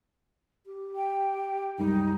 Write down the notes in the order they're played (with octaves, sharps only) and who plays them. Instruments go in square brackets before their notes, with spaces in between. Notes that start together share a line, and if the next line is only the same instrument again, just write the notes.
[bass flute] G4
[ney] G5
[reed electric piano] C2 F#2 G3 [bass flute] G#3 [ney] D#4